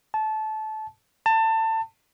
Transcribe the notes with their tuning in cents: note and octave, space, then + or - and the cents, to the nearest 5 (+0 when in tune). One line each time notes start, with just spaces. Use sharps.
A5 -20
A5 +25